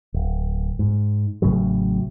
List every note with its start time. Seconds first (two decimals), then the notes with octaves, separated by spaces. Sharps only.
0.14 D1
0.79 G#2
1.42 A1 A2 C#3 F#3